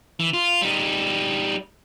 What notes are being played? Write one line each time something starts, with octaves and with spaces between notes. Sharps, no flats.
E3
F4
G3 D#4